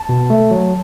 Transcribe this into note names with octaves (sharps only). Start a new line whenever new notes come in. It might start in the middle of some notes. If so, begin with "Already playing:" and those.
Already playing: A5
B2
A3
F#3